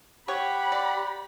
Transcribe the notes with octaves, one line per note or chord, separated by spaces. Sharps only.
G4 C#5 F#5 B5
D5